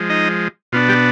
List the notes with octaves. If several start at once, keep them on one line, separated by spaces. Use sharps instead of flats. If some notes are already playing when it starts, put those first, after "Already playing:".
Already playing: F3 G#3
D#4 D#5
B2 B3 D4 F4
G3 G4